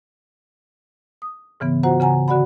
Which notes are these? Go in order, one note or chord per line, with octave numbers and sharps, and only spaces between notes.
D#6
G#2 C#3 E3 B3
F4 F#4 C5 F#5 A#5
C#3 F#5 G#5 A#5
D3 F#4 D5 F#5 B5